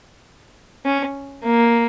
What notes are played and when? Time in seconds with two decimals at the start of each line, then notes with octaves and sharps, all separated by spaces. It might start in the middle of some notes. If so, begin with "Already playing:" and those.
0.86 C#4
1.44 A#3